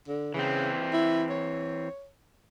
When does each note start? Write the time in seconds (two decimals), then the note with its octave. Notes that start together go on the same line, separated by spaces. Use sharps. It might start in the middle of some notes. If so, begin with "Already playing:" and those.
0.08 D3
0.34 C#3 E3 C4
0.93 E4
1.30 C#5